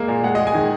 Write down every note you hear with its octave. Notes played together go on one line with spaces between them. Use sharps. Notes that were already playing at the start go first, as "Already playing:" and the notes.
Already playing: G#3 A#3
A#2
G#3 F#5
G#3 D#5
G#5
D#3